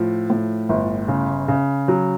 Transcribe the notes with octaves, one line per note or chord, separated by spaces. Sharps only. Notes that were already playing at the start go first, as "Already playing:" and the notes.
Already playing: A2 F3
A2
G1
C#3
C#3
F#3